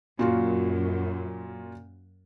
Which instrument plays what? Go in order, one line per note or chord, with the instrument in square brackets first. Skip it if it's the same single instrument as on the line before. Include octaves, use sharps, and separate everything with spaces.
[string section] F#2 [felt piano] A#2 F4 F#4